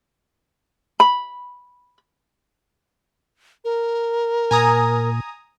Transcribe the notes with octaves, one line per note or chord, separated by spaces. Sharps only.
B5
A#4
A#2 G#5 A#5 D#6